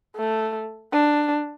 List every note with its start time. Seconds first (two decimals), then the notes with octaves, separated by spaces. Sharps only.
0.16 A3
0.93 D4